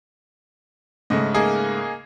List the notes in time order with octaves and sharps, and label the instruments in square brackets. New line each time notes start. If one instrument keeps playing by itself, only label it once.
[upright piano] G#2 C#3 A3 [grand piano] D#5
[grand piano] A#3 D#4 G#4